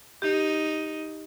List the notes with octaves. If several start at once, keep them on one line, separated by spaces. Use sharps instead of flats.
D#4 G4